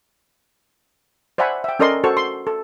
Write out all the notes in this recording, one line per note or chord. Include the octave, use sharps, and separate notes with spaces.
C5 D5 E5 F#5 G#5 B5
E5 G5
C#4 A4 A#4 D5 D#5 C6
F#4 A4 C5 C#6
C6
A4